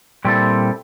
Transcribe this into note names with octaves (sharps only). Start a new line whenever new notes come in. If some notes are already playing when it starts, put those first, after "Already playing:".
A#2 G3 C4 E4 A4